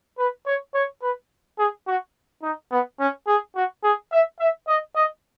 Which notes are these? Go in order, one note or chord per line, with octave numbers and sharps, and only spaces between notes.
B4
C#5
C#5
B4
G#4
F#4
D#4
B3
C#4
G#4
F#4
G#4
E5
E5
D#5
D#5